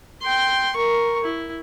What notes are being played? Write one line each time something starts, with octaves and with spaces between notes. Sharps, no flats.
G5 C6
A#4 C#6
E4